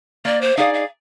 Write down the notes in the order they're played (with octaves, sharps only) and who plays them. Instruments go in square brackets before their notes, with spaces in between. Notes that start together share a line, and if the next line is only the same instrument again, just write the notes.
[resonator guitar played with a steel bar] A#3 [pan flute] D5
[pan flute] C5
[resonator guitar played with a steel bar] D#4 G#4 D5 [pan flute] F5
[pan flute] F5